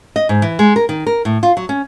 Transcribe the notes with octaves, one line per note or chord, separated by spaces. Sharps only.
D#5
G#2
E3
G#3
A#4
D#3
A#4
A2
F4
F#3
C#4